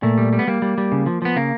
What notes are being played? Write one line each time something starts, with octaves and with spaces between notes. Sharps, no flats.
A#2 A3
G3
G3
B3
G3 A#3
G3
G3
C#3
F3
F3 B3
C#3 A#3